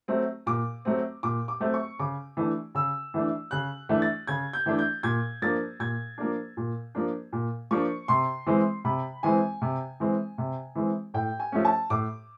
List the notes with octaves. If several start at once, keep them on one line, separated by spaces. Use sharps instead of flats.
F#3 A3 C4
A#2 D6
F#3 A3 C4
A#2 D6
D6
F#3 A3 C4
C#6
C#3 D6
E3 A3 D4
C#3 E6
E3 A3 D4
C#3 F#6
E3 A3 D4
A6
C#3 G#6
G6
E3 A3 D4
G6
A#2 G#6
F3 A#3 D4 A6
A#2 G#6
F3 A#3 D4
A#2
F3 A#3 D4
A#2
F3 A#3 D4 C#6
C3 C6
E3 G#3 C4
C3 B5
E3 G#3 C4 G#5
C3
E3 G#3 C4
C3
E3 G#3 C4
A2 G5
G#5
F3 A3 C#4
A5
A2 D6